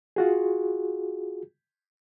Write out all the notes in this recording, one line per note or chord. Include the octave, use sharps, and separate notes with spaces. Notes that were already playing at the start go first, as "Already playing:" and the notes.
F4 F#4 G#4